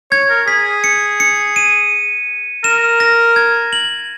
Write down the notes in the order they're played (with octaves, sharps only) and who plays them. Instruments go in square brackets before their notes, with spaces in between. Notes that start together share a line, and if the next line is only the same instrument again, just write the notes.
[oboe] C#5 [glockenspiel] G#6
[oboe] A#4
[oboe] G#4 [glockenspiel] B6
[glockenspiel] C#7
C#7
D#7
[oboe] A#4 [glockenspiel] E7
[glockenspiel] A#6
G#6
F#7